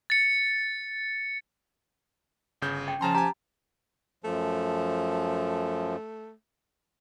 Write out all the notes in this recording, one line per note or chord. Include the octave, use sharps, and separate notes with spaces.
A6 C#7
G1 C#3 G6
G5
C#3 F3 C#4 A5 A#5 C6
G4 G#5 A#5
F#2 F3 A3